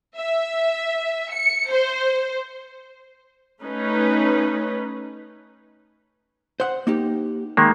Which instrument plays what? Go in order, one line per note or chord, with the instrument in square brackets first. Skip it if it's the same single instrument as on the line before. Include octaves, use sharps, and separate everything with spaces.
[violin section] E5
C#7
C5
[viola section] A3 C#4 D#4 B4
[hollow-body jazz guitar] C5 F#5
A#3 D#4 G4
[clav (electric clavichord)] D#3 G#3 A#3